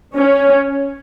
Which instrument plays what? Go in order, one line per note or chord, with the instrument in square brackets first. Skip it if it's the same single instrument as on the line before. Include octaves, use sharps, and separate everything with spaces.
[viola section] C#4